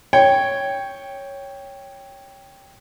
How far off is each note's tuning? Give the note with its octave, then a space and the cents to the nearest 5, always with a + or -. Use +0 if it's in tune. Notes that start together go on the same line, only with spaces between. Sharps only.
C#5 +0 G5 +5